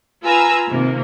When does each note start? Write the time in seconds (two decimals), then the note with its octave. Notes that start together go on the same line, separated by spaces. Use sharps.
0.23 F4 B4 G#5 A#5 E6
0.68 C3 D#3 A#3